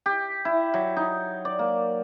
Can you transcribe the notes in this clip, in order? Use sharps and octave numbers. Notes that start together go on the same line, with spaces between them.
G4
E4
F#3
D#4
D5
A#3